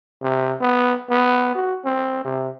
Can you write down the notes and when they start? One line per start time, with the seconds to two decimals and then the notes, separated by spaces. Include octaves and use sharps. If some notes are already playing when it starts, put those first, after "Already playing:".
0.22 C3
0.61 B3
1.10 B3
1.55 F#4
1.85 C4
2.25 C3